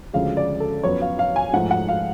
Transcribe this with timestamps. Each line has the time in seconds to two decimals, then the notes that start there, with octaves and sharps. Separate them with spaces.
0.13 D2 C#3 F3 G#3 F5
0.37 D5
0.60 A4
0.84 F#2 F3 B3 C#5
1.02 F5
1.19 F5
1.36 G#5
1.53 G#2 F3 A3 F#5
1.71 F#5
1.88 F5